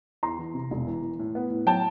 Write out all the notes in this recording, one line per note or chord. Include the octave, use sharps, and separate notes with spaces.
E2 A#5 C6
E3
C3
E1
E3
E3
A2
B3
A2
F#3 G5 A5